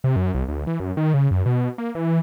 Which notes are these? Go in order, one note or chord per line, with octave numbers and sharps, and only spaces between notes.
C3
F#2
C2
D2
E3
F#2
D#3
C#3
F#2
B2
A#3
E3